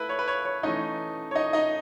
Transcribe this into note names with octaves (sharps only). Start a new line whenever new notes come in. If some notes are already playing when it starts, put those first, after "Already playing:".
Already playing: A3 E4 B4
C#5
B4
C#5
C#5
E3 A3 C#4 D#4 D#5
C#5
D#4 D#5
D#4 D#5